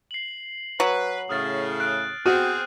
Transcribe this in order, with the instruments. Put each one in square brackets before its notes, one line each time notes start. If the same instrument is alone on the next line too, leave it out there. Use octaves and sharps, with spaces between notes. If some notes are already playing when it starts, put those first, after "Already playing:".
[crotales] C7 F#7
[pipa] F#3 [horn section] B4
[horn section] A2 C#3 [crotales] D#6 F6 A6
[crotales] F#6 D7
[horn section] B3 C4 G#4 [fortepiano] F#4 [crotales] D#6 F6 D#7